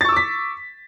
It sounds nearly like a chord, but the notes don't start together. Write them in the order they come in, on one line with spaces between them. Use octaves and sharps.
A6 C#6 E6 D6 B6